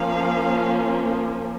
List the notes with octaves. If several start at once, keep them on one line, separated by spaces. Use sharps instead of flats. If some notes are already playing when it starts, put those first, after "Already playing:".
Already playing: F3 A#3 C#4 F5